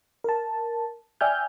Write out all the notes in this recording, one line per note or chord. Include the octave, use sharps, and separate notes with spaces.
A#4 A5
D5 E5 G5 G#5 F6 G6